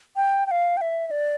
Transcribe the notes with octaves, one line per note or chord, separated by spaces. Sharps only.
G5
G5
F5
G5
E5
E5
D5